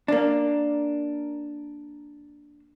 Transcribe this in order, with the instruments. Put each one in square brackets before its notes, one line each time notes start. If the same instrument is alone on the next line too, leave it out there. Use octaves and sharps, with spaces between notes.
[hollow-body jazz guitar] A#3 D4